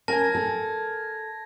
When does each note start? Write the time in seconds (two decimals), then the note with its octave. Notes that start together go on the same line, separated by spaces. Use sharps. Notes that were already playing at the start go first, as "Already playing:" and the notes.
0.08 C#4 A#4 G#5 A5 G#6 A#6
0.35 A4